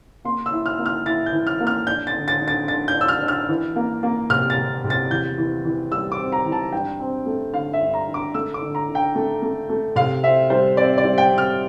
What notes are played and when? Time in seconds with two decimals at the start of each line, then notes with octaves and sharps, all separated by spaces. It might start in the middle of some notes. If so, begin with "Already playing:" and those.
0.25 A#3 C6
0.46 E6
0.52 E4
0.66 F6
0.79 A#3
0.86 F6
1.06 E4 A6
1.26 G6
1.33 E3
1.47 F6
1.60 A#3
1.67 F6
1.87 D4 G6
2.07 A6
2.14 D3
2.28 A6
2.41 D3
2.48 A6
2.68 D3 A6
2.88 G6
2.95 D4
3.01 E6
3.08 F6
3.22 D4
3.28 F6
3.49 E3
3.76 A#3
4.03 A#3
4.30 C3 F6
4.50 A6
4.57 C3
4.84 C3
4.90 A6
5.11 E2 G6
5.38 E3
5.65 E3
5.91 G3 E6
6.12 D6
6.19 C4
6.32 A#5
6.45 E3
6.52 A5
6.72 G2 G5
7.00 C4
7.26 A3
7.54 D3 F5
7.73 E5
7.80 G2
7.94 A#5
8.07 D3
8.14 D6
8.34 A3 E6
8.54 D6
8.62 D3
8.75 A#5
8.88 D3
8.95 G5
9.15 A3
9.42 A3
9.69 A3
9.96 C3 F5
10.23 C4 E5
10.50 G3 C5
10.77 C4 D5
10.98 D5
11.04 G3
11.18 G5
11.31 C4
11.38 F6